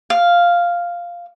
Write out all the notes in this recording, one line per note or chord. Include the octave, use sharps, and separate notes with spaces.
F5